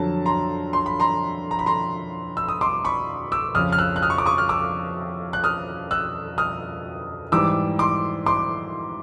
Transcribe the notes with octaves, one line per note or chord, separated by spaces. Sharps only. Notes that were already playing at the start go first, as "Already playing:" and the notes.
Already playing: F2 D3 F#3 A5
A#5 C6
C6
B5
A#5 C6
A#5
B5
A#5 C6
E6
D#6
C6 D6
B5 C#6
D6 E6
F2 C#3 F3 D#6 F6
F6
E6 F#6
F#6
D#6 F6
C#6
D6
C#6 D#6
F6
D6 E6
F#6
D#6 F6
E6 F#6
D#6 F6
G#2 E3 G3 D6 E6
C6 D6
C6 D6